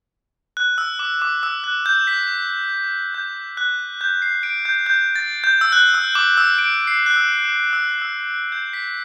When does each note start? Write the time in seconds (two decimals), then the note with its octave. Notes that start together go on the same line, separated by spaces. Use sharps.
0.57 F#6
0.78 E6
0.99 D6
1.22 D6
1.43 E6
1.64 F#6
1.86 G6
2.07 B6
3.14 G6
3.57 F#6
4.01 G6
4.22 C7
4.43 D7
4.65 G6
4.86 G6
5.16 A6
5.44 G6
5.61 E6
5.72 F#6
5.94 E6
6.15 D6
6.37 E6
6.58 D7
6.87 C7
7.06 F#6
7.16 E6
7.45 D6
7.73 E6
8.02 E6
8.31 F#6
8.52 G6
8.73 B6